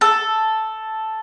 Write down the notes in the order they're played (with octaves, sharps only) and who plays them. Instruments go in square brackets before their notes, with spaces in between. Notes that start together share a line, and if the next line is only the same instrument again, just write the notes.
[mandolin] A4